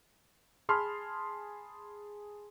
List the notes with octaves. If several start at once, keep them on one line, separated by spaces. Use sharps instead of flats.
G#4 A5 B5 C6 F6